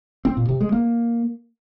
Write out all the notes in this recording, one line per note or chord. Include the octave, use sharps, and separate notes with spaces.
C4
A#2
C3
G#3
A#3